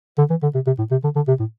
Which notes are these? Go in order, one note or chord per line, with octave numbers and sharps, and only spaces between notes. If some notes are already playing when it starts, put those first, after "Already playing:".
D3
E3
D3
C3
C3
A2
C3
D3
D3
C3
A2